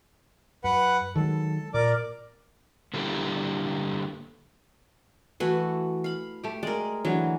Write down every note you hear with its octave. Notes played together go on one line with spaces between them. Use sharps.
F#2 B4 F#5
D#3 F#3 G#3 A4
A#2 A#4 D5 D6
D3 G3 A#3 E4 G4 A4
E3 A3 E4 F#4 B4
F5 B5
A3 G4
G#3 A#4 D5
D3 E3 F#3